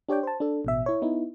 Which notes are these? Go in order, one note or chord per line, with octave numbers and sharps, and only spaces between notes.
D4 G4 C#5 D5 G5
C5 A5
D4 A4
A1 B2 E5
E4 C#5
B3 D#4 E4